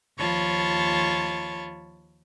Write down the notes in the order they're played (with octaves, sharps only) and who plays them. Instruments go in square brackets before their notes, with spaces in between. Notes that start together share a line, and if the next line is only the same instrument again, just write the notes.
[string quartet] D#2 F3 F4 C#5 A5 B5